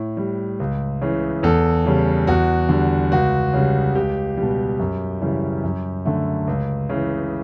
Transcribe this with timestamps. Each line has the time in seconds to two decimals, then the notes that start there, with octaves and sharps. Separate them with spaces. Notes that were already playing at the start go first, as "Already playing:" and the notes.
Already playing: A2
0.17 G3
0.60 C#2
1.02 C#3 E3
1.43 E2 A4
1.86 C#3 G3
2.27 E2 F#4
2.69 D3 G3
3.12 C#2 F#4
3.53 C#3 G3
3.95 C#2 G4
4.37 B2 G3
4.79 F#2
5.21 C#3 E3 G3
5.64 F#2
6.05 D3 A3
6.47 C#2
6.89 C#3 E3